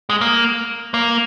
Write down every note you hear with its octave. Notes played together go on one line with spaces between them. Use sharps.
G#3
A#3
A#3